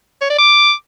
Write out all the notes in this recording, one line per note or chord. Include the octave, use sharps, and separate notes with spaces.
C#5
D5
D6